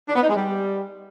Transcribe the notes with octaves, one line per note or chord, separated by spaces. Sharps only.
D4
B3
D#4
G#3
G3